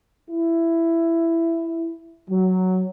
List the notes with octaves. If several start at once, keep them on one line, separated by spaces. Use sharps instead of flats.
E4
F#3